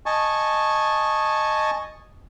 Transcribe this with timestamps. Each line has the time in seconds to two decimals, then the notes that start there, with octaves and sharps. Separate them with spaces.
0.06 D#5 G#5 A5 C#6